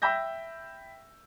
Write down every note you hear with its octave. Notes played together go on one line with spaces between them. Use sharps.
E5 G5 B5 E6 G6 A#6